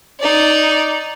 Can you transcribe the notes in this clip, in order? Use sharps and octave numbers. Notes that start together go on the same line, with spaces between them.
D#4 D5